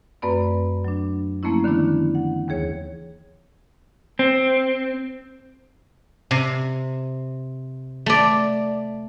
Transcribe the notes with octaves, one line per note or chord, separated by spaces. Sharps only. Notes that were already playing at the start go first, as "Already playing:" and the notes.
F#2 A3 C4 B4 D5 B5
F#3 D4
F3 A3 A#3 C4 C#4 E4
D3 D#3 B3 D4 E4
F#5
D#2 E3 G#4 C#5
C4
C3
A3 D5